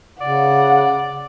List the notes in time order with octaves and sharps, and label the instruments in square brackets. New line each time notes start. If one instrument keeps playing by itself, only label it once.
[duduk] C#3 [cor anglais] D5 [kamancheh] F#5